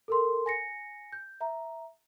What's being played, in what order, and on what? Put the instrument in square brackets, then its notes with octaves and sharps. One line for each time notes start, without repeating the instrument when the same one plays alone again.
[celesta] A4 A#4 C6
G#5 A#6 C#7
G6
E5 A#5